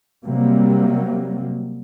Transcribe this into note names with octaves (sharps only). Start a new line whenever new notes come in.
C3 F#3 G3 A#3